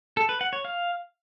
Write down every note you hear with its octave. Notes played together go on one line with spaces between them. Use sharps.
A4
B4
F#5
C#5
F5